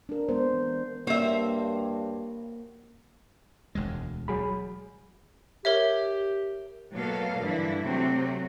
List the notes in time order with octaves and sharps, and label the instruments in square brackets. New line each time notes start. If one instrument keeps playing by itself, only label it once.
[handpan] D4 A#4
G#3 B3 C5
E3
[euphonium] G2 [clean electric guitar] A#3 F#4 C#5 [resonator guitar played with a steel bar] C5 E5
[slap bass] E1 D2 G#3
[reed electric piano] F#3 G#4 B5
[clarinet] G4 [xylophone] A#4 C#5 E5
[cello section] B2 F#3 A3 A#3 A4 F5
G2 D3 E3 E4
C3 F#3 A3 C4 F#4